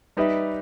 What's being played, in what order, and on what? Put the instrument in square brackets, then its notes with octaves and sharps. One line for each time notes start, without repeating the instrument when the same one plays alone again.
[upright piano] G3 D#4 G4 B4 E5